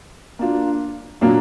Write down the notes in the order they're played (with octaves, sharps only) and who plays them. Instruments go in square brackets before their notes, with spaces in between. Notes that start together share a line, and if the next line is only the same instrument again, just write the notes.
[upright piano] A#3 D4 F4
A#2 F#3 A#3 D4